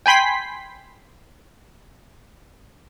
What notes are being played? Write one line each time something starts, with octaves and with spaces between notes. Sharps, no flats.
G5 G#5 B5 C6 B6